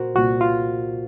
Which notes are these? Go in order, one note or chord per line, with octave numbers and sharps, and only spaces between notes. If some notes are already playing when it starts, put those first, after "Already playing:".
Already playing: A#2 F#4 A#4 C5
C2 A#2 F#4
F4